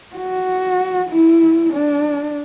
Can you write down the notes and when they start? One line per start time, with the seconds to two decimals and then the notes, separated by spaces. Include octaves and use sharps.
0.16 F#4
1.10 E4
1.73 D4